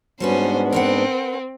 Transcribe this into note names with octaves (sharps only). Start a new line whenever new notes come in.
G#2 G3 B3 C#4 D4 F#4 B4 C5
C4 A#4 B4 F#5